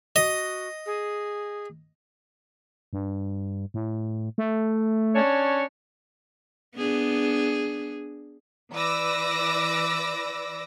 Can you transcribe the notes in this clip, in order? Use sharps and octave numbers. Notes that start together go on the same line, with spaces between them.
F#4 D#5
G#4
G2
A2
A3
C#4 D4 C#5
B3 D4 G#4
E3 B4 D5 D6 E6 A#6